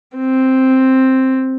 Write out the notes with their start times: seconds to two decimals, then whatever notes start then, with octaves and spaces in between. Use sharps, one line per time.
0.17 C4